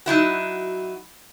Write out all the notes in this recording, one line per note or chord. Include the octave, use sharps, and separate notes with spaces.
F#3 D#4 E4 F#4